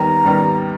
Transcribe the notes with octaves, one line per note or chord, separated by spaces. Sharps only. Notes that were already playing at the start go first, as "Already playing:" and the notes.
Already playing: D#2 D#3 G3 B3 A#5
D#2 D#3 G3 B3